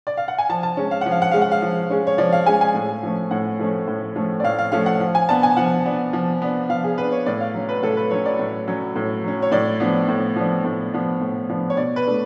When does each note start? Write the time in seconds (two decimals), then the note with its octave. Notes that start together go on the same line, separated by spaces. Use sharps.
0.07 D5
0.17 F5
0.28 F#5
0.38 G#5
0.49 F3 A5
0.63 A5
0.77 G#3 C#4
0.91 F5
1.01 F3 F#5
1.12 F5
1.22 F#5
1.31 G#3 C#4 F5
1.42 F#5
1.52 F5
1.62 F3
1.90 G#3 C#4
2.07 C#5
2.18 F3 D5
2.33 F5
2.46 G#3 C#4 G#5
2.61 G#5
2.74 A2
3.03 F3 A3 C#4
3.31 A2 F#5
3.59 F3 A3 C#4
3.88 A2
4.16 F3 A3 C#4
4.40 D5
4.44 A2 F5
4.59 F5
4.72 F3 A3 C#4 F5
4.86 F#5
5.00 F3
5.15 G#5
5.29 B3 D4 A5
5.43 G#5
5.57 F3 F#5
5.85 B3 D4
6.13 F3
6.42 B3 D4
6.69 F3 F5
6.84 G#4
6.98 B3 D4 B4
7.12 C#5
7.26 A2 D5
7.41 F5
7.54 F#3 C#4
7.69 B4
7.83 A2 A4
7.97 B4
8.11 F#3 C#4 C#5
8.26 D5
8.39 A2
8.68 F#3 C#4
8.96 A2
9.24 F#3 C#4
9.42 C#5
9.52 A2 D5
9.80 F3 B3 D4
10.09 A2
10.36 F3 B3 D4
10.65 A2
10.93 F3 B3 D4
11.21 A2
11.49 F3 B3 D4
11.70 C#5
11.77 B2 D5
11.96 B4
12.06 A3 D4